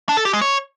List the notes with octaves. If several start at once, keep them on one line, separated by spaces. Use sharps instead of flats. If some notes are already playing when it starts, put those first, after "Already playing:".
D4
A4
G4
G#3
C#5